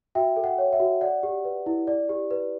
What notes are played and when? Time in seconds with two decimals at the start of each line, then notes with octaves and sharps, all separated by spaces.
0.15 F#4 E5 G5
0.36 A4
0.44 F#5
0.58 C#5
0.73 E5
0.80 F#4
1.01 D5 F#5
1.23 G4
1.45 B4
1.66 E4
1.87 D5
2.09 G4
2.31 B4